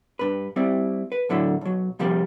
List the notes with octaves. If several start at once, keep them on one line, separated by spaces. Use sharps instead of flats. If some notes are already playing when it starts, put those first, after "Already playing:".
G2 B4
G3 C4 E4
B4
A2 D3 F#3 E4
B1 F#3
C3 F3 G3 A#3